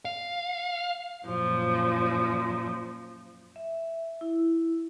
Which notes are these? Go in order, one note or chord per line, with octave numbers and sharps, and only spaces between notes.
F5
F#2 A#2 F3
E5
E4